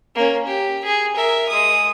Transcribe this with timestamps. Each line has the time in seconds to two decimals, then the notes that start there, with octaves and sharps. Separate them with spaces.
0.15 A#3 C#4
0.47 G4
0.85 G#4
1.16 A#4 E5
1.49 G#3 D#6